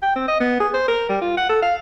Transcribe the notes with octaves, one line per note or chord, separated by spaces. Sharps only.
G5
C4
D#5
B3
G#4
C5
A#4
G3
F4
F#5
A4
F5